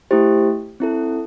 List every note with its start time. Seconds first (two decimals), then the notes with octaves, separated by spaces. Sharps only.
0.11 A3 E4 G4 C5
0.80 C4 E4 A4